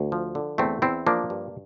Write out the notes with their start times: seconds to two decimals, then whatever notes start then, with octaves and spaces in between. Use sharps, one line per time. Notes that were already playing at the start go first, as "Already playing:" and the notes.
Already playing: D2
0.12 F3
0.35 D3
0.58 E2 A3 C4
0.82 E2 C4 E4
1.07 F3 A#3 D4
1.30 G2